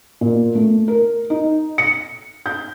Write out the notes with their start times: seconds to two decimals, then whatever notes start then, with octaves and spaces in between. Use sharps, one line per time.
0.21 A#2
0.55 A3
0.88 A#4
1.30 D#4
1.78 C#7
2.46 G6